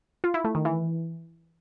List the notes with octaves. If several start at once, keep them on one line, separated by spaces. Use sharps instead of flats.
F4
E4
A3
D#3
E3